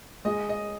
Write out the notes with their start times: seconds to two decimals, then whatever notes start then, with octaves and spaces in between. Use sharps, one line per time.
0.25 G#3 D#5
0.49 D#5